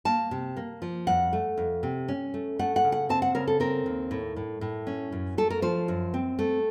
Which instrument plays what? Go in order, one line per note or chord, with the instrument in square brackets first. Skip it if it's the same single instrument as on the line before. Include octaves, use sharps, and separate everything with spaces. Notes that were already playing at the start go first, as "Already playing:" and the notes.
[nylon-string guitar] A#3 A5
C3
A#3
F3
F2 F#5
A3
F2
C3
C#4
A3
A3 F#5
F#5
C#3
F#5
C4 A5
F#5
C#3 A#4
A4
C4 A#4
D#2
A2
A2
A2
C#4
F#2
A3 A4
A#4
F3 C5
F#2
C4
A3